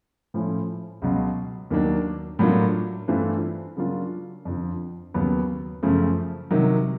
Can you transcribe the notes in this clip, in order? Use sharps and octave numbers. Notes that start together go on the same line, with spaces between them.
A2 F3 A3 C#4 E4
C#2 B2 F#3
D#2 D#3 F#3 A#3 D4
A2 F#3 A#3 D4 F4
G2 E3 A3 C4 F4
C#3 F#3 A#3 D4 F4
F2 D3 F3
D#2 C#3 F#3 B3
F#2 C#3 F3 A3
C3 D#3 F#3